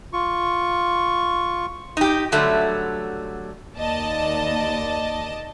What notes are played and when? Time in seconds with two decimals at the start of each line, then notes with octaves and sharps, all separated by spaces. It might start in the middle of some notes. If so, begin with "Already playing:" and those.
0.13 F4 C#6
1.97 D#4 G4
2.32 D3 F#3 G3 A3
3.78 D#2 D5 D#5 A5